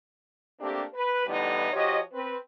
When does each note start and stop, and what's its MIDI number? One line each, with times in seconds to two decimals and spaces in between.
0.60 0.83 57
0.60 0.83 58
0.60 0.83 60
0.60 0.83 62
0.60 0.83 67
0.94 1.24 71
1.26 1.69 45
1.26 1.69 50
1.26 1.69 52
1.26 1.69 55
1.26 1.69 59
1.26 1.69 63
1.73 1.99 53
1.73 1.99 66
1.73 1.99 67
1.73 1.99 73
1.73 1.99 75
2.13 2.36 60
2.13 2.36 71